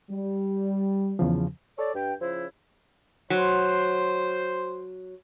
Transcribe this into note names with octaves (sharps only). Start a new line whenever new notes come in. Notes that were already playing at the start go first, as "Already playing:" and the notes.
G3
E2 C#3 F3
A4 C#5 D5
G2 G5
C#3 F3 E4 C5
F#3 C5